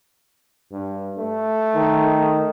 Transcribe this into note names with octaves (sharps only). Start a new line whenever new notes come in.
G2
A3
D#3